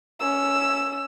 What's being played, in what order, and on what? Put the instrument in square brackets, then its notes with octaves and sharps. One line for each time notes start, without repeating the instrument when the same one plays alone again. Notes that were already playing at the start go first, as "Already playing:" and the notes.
[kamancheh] C#4 E6